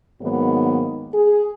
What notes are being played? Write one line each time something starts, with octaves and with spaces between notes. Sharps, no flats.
G#2 D#3 F#3 A#3 B3
G#4